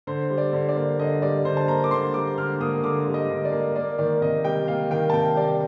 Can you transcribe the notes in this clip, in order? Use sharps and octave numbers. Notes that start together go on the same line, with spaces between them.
D3 C5
G3
D5
D3
D5
A#3
D3 D#5
G3 D5
D3 C5
A5
A#3 A#5
D6
D3 C6
G3 D6
D3 F6
A#3 D#6
D3 D6
G3
D#5
D3
D5
A#3
A#3 D5
D#3 D5
C3 D#5
G3 G5
A#3 F5
D#3 G5
A5
C3 G5
G3 D5